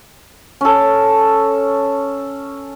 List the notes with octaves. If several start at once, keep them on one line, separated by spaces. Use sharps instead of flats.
C#4 A4